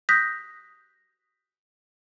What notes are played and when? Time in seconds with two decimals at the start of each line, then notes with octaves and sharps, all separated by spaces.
0.09 D#6 F#6 G6 A#6 B6